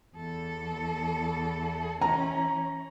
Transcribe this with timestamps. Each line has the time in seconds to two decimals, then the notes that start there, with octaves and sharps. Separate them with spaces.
0.15 E2 A4
2.01 E3 C#4 A#5